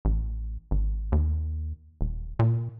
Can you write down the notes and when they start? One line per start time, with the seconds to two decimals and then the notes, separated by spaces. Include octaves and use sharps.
0.05 A1
0.71 G#1
1.12 D#2
2.01 D#1
2.39 A#2